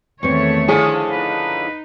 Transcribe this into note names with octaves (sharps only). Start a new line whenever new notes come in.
E2 D#3 A3 C4 C#5 C#6
D3 F3 C#4 E4 G#4
D#4 B4